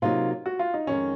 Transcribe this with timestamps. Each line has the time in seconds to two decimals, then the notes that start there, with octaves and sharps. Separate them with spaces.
0.02 C3 F#3 A#3 D#4 F4
0.46 F#4
0.59 F4
0.74 D#4
0.87 F2 D#3 G#3 C#4